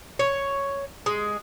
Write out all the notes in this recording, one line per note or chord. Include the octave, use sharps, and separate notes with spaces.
C#5
G#3